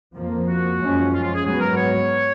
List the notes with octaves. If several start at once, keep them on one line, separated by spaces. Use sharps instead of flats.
F2 F3 A#3
F#4
F#2 F3 G#3 C#4
F4
F4
G#4
G#2 F#3 B3 G#4
A#4
C#5